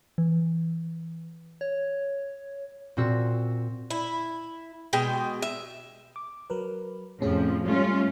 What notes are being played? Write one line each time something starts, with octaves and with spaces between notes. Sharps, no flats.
E3
C#5
A#2 C4 F#4 E6
E4
B2 G#3 G5
E5
D6
F#3 A#4 B4
F2 A2 C3 F3 C#4 G#4
G#2 G3 A3 C#4 F4